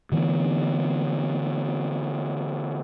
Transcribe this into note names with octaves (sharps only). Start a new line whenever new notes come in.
D3 E3 A3 B3